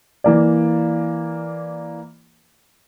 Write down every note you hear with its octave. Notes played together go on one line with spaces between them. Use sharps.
E3 A#3 D5